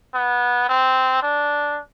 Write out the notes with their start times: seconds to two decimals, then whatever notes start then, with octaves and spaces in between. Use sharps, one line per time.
0.14 B3
0.69 C4
1.23 D4